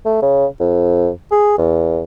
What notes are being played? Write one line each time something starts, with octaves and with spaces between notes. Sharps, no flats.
A3
C#3
F2
G#4
E2